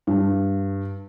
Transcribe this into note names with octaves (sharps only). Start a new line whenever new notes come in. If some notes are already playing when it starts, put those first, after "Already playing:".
G2